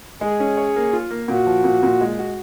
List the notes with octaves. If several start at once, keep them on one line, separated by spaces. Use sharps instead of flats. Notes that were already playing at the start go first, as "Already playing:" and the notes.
G#3 G#4
C#4
C#5
A#3
F4
A#3
A#2 F#4
F3
A#2
A#2
G#3
F#4